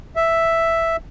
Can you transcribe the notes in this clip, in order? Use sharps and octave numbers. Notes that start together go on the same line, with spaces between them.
E5